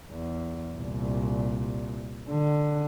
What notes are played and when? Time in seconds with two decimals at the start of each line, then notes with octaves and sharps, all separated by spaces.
0.11 E2
0.75 C2 A#2
2.30 D3